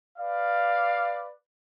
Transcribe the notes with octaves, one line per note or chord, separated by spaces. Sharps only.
B4 D5 F5